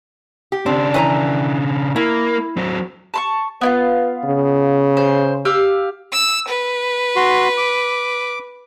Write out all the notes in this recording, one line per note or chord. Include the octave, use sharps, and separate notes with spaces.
G4
C#3 C4 D4
E3 C5 A#5
A#3 E4
F#3 C4
A5 C6 C#6
B3 E4 F4 B4
C#3
C5
G4 F5 E6
E6
B4
F#4 C6
D6